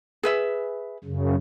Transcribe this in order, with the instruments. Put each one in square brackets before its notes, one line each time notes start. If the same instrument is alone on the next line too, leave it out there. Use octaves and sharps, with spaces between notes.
[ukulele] G#4 B4 E5
[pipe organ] F#2 C#3